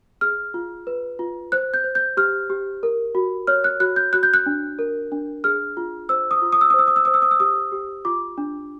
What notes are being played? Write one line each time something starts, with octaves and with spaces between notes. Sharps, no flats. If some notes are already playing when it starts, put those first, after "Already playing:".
G#4 F6
F4
B4
F4
C5 F#6
G6
C5
G6
G4 F6
G4
A#4
F#4
C#5 F6
F#6
F#4 F#6
G6
F#4 F#6
G6
F#6
D4
A#4
D4
G#4 F6
F4
C5 E6
D#6
F4
D#6
E6
D#6
C5 E6
D#6
E6
C5 D#6
E6
D#6
E6
G4 D#6
G4
F4 D6
D4